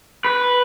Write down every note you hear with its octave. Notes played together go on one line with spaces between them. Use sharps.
B4